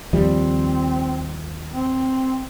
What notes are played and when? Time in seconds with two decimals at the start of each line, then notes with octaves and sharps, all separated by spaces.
0.13 D#2 F3 G3 C4
1.73 C4